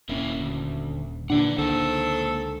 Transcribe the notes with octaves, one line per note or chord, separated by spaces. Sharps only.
D#1 A#3 C#4 E4
D2
A#2 D3 E3 D4 D5 F#5
C#2 D3 D#3 A#3 A4 C5